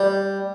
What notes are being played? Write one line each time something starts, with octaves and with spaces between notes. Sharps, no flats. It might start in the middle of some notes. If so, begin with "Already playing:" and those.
Already playing: G3